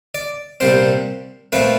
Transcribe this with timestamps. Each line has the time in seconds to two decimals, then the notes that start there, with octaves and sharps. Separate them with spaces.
0.15 D5
0.60 C2 A#2 G3 C4 C5
1.52 A#2 F3 A3 C4 B4